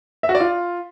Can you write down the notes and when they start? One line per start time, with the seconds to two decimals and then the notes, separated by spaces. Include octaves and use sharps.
0.23 E5
0.29 F#4
0.35 D5
0.40 F4